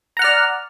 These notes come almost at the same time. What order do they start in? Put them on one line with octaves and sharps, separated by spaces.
A#5 F#5 F6 D5